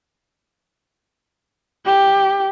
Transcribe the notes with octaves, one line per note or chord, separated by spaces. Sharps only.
G4